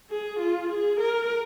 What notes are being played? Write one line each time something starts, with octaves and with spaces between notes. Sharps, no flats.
G#4
F4
G#4
A#4